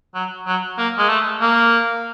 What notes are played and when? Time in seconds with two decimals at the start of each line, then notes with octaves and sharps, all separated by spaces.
0.15 F#3
0.47 F#3
0.78 A#3
0.98 G#3
1.09 A3
1.41 A#3